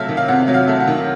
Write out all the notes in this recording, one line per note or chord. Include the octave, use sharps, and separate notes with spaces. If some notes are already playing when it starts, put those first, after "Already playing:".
Already playing: C3 F#3 A3 E5 F5
D#3
F5
C3 F#5
F#3
F5
A3
F#5
D#3